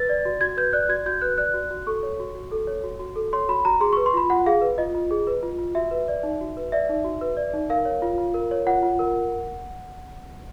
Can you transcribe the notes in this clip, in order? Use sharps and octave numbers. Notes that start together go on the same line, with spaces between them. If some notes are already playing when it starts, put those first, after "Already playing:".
Already playing: B4 A6
D5
F#4
F#4 G#6
B4 G6
D5 F#6
F#4 G#6
F#4 G6
B4 F#6
D5 F#6
F#4
F#4
A4 C#6
C#5
F#4
F#4
A4
C#5
F#4
F#4
A4
C#5 C6
F#4 B5
F#4 A#5
G#4 C6
B4 C#6
C6
F4 B5
F4 F#5
G#4 F5
B4
F4 D#5
F4
G#4
B4
F4
F4
F#4 E5
B4
D5
D#4
F#4
B4
D5 E5
D#4
F#4
B4
D5
D#4
A#4 F5
C#5
F4
F4
A#4
C#5
F4 F#5
F4
A#4